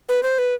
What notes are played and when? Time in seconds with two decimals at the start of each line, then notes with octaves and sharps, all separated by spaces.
0.09 B4
0.23 C5
0.39 B4